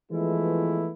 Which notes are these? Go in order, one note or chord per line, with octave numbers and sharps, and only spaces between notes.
E3 F3 G#3 A3 B3 E4